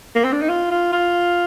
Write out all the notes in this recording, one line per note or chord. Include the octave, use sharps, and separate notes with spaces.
A#3
C4
D4
D#4
F4
F4
F4